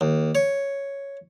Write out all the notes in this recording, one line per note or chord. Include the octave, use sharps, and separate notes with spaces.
D#2
C#5